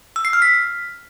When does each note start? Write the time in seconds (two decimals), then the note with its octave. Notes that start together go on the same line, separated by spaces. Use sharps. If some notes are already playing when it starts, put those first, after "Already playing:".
0.16 E6
0.25 C7
0.33 F6
0.42 B6